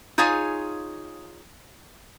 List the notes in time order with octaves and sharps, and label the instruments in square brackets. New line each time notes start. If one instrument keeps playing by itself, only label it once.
[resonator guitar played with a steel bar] D#4 F4 G#4 C#5 F5 G#5